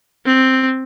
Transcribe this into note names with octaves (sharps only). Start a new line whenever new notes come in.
C4